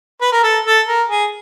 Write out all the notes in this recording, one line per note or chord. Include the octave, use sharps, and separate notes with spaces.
B4
A#4
A4
A4
A#4
G#4